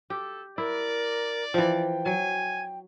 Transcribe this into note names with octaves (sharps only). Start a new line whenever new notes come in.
G4 A4
E4 A#4 D5
E3 F3 G5
F#3 G#5